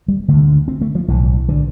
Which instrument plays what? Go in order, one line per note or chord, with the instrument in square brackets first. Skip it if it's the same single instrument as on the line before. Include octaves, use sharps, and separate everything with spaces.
[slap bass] G3
D2 D3 A3
C4
A3
F3
B1 A2 E3
D3